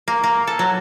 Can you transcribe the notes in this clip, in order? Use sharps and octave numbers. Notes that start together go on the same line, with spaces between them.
A#3
A#3
A4
F#3